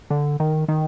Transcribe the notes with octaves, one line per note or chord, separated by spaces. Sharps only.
D3
D#3
D#3